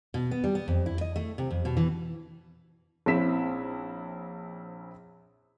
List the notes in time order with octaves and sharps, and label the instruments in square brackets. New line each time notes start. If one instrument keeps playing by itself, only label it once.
[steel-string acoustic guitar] B2
B3
G3
B3
F2
E4
D#5
A3
C3
F2
B2
E3
[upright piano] A#1 C4 C#4 E4 B6 E7